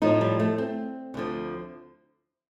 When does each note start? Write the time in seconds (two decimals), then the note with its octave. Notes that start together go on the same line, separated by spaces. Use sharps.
0.02 A2 F3 D#4
0.21 G3
0.40 A3
0.58 C4
1.14 D2 D3 F3